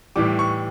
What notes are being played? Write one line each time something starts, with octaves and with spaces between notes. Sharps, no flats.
A2 E3 G3 D6
C#6